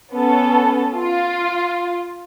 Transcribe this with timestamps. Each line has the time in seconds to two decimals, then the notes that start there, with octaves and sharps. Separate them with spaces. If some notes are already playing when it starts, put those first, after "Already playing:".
0.14 B3 C#4 A4
0.97 F4